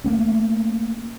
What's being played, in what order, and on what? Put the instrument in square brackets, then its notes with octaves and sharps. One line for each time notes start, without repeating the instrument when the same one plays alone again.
[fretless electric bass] A3 A#3 C#4